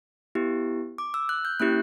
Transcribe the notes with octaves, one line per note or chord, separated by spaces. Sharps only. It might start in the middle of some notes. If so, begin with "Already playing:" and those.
B3 E4 G4
D6
E6
F#6
G6
A#3 C#4 E4 G4 F#6